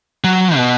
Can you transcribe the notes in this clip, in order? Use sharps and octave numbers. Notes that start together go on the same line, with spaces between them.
F#3
B2